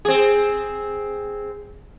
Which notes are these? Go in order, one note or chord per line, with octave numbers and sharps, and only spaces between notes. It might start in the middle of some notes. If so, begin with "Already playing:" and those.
C4 G#4